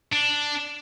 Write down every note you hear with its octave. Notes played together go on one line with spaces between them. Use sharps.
D4